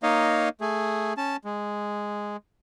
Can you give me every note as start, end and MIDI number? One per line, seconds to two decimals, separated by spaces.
0.03 0.49 58
0.03 0.49 63
0.03 0.49 73
0.03 0.49 75
0.03 0.49 77
0.61 1.13 57
0.61 1.13 68
1.17 1.36 61
1.17 1.36 81
1.45 2.37 56